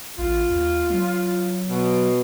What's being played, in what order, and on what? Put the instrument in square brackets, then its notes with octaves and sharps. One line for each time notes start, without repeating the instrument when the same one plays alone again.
[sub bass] A1 [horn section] F4
[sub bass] D#2
F#3
[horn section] B2